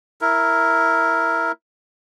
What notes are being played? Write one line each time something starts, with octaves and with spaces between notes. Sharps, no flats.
E4 A#4